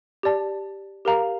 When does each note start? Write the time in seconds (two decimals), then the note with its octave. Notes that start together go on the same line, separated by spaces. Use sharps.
0.23 G4 D5 A5
1.05 G4 A#4 F5 A#5